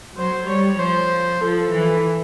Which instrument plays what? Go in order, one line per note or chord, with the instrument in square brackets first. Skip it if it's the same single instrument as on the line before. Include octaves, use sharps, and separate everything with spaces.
[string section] F#3 [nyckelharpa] C5
[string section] G3 [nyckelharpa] C#5
[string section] F3 [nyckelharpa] C5
[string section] F3 [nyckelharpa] A4
[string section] E3